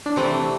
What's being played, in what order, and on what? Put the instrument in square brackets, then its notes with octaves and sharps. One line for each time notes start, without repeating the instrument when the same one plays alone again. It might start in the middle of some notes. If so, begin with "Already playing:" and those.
[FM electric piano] D4
[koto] C3 E3 A3 [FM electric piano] C4